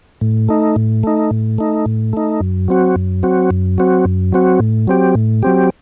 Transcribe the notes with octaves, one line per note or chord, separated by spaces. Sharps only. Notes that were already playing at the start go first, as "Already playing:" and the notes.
A2
A3 D#4
A2
A3 D#4
A2
A3 D#4
A2
A3 D#4
F#2
F#3 C4 F#4
F#2
F#3 C4 F#4
F#2
F#3 C4 F#4
F#2
F#3 C4 F#4
A2
F#3 C4 G4
A2
F#3 C4 G4